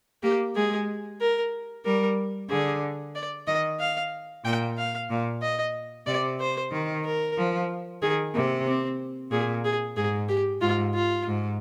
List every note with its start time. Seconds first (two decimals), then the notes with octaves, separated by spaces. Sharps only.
0.23 A#3 G4
0.55 G#3 G#4
1.21 A#4
1.85 G3 A#4
2.50 D3 G#4
3.15 D5
3.47 D#3 D#5
3.80 F5
4.44 A#2 G5
4.78 F5
5.10 A#2
5.42 D#5
6.07 C3 D5
6.40 C5
6.72 D#3
7.05 A#4
7.37 F3
8.02 D#3 G#4
8.35 C3 A#3
8.67 C4
9.31 A#2 G#4
9.65 G#4
9.96 G#2 G#4
10.29 G4
10.61 G#2 F4
10.94 F4
11.27 G#2